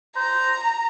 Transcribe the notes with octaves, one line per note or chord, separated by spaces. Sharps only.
C5 A#5